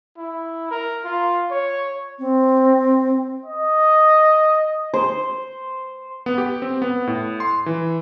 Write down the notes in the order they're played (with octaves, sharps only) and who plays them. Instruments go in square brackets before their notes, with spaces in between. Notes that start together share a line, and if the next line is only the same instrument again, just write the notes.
[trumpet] E4
A#4
F4
C#5
[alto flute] C4
[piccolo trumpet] D#5
[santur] C5
[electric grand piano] B3
G4
C4
B3
A2
C6
E3